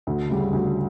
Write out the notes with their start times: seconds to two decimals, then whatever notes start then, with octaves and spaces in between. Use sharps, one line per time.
0.07 D2
0.30 C#3 G3
0.53 D2